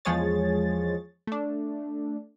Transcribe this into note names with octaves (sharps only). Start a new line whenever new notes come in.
E2 F3 G#3 G#4 C#5 A6
A3 D4